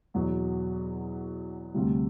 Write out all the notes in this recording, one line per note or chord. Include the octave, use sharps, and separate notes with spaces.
E2 B2 F#3 B3
D2 C3 G3